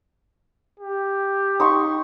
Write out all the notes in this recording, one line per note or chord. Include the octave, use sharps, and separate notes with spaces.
G4
D#4 C6 C#6